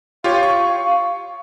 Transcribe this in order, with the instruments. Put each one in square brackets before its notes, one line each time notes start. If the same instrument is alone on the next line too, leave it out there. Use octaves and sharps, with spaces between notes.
[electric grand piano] F4 G4 C#5 [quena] F5
[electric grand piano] C#6